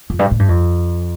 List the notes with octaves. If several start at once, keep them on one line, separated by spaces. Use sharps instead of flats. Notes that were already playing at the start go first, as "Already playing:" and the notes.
F2
G2
A2
G2
F2